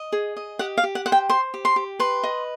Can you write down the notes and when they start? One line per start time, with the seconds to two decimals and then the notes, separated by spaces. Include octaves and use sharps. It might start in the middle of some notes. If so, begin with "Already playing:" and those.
Already playing: D#5
0.12 G#4
0.37 D#5
0.59 G4 F#5
0.78 F5
0.83 G4
0.95 F#5
1.06 C5 F#5
1.12 G5
1.29 C5 C6
1.54 G4
1.65 C6
1.76 G4
1.99 B4 C6
2.23 D#5